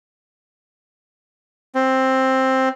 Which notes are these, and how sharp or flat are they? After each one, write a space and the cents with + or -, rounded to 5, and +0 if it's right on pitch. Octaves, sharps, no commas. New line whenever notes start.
C4 +10